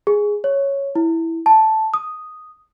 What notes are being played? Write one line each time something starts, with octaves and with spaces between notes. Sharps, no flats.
G#4
C#5
E4
A5
D#6